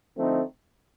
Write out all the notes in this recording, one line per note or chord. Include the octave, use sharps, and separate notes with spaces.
D3 F3 A3 C4 D#4